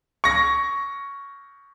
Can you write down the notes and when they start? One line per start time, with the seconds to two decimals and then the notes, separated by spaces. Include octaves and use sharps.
0.24 C#6 A#6